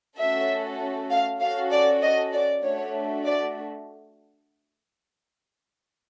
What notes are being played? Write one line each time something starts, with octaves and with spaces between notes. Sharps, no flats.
A3 C#4 F#4 A4 E5
F5
C#4 F#4 A4 F5
D5
D#5
D5
A3 D4 F#4 C#5
D5